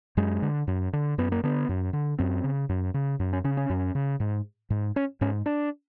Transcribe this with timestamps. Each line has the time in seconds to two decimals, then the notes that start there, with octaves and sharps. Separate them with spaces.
0.17 F#2 G#3
0.42 D3
0.67 F#2
0.93 D3
1.18 F#2 B3
1.32 A#3
1.43 D3 B3
1.69 F#2
1.93 D3
2.18 F#2 C4
2.44 C#3
2.69 F#2
2.94 C#3
3.20 F#2
3.33 C#4
3.44 C#3 C#4
3.57 C#4
3.70 F#2
3.95 C#3
4.20 G#2
4.70 G#2
4.96 C#4
5.21 G#2 C#4
5.46 D4